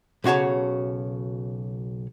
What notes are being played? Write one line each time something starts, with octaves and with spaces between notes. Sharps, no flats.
B1 C#3 F#4 C#5 A5